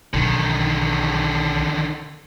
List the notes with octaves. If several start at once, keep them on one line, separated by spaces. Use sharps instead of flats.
B1 D3 D#3